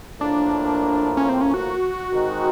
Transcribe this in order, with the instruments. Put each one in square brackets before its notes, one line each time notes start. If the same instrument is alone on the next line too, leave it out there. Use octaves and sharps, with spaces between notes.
[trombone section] A2 F3 A#3 [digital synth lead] D4
[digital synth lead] C#4
C4
C#4
F#4
[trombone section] D#3 G#3 C4 D#4